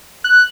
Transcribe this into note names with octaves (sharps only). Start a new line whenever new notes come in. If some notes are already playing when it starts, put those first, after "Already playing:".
F#6